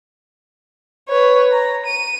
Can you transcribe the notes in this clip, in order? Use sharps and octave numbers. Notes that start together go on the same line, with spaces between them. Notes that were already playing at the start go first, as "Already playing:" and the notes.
B4 C#5
A#5
D#7